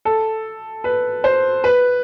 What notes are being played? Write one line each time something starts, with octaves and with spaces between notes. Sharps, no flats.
A4
B4
C5
B4